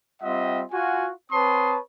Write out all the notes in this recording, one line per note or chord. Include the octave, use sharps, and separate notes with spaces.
G3 C4 F4 D#5 E5 F#5
F4 F#4 G#5
C4 B4 C#5 A5 C6 D#6